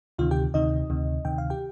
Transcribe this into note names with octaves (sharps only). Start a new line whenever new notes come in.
D2 C3 D#3 F4 F5
G4 G5
D2 C3 D#3 D#4 D#5
D2 C3 D#3
D2 C3 D#3 G5
F5
G4 G5